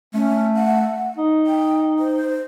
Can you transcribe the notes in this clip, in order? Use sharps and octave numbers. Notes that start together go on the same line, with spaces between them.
A3 C#4
F#5
D#4
G5
C5